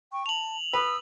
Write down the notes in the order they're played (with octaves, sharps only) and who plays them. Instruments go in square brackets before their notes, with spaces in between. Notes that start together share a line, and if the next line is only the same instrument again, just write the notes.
[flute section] G5 C#6
[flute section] A5 [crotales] F7 F#7
[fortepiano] B4 [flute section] D#6 E6